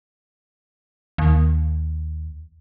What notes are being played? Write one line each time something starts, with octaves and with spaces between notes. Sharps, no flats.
D#2